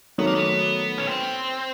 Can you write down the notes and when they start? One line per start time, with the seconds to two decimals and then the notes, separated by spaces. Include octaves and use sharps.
0.18 D#3 F#3 A3 B3
0.27 A#3
0.35 B3
0.98 C#4
1.08 C4